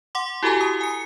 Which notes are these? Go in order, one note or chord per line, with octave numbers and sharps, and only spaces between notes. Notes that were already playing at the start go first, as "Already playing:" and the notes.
F#5 C6 D6
E4 F#4 G4 A4 G#5 A#5
D#6
G#5 C#7